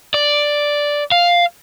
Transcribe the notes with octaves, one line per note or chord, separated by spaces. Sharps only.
D5
F5